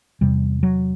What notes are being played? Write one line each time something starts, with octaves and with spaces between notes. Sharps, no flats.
E2 C3 G3
F#3